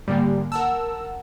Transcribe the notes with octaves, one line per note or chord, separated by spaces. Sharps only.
G#2 D3 G3 A#3
A#4 F#5 A5 E6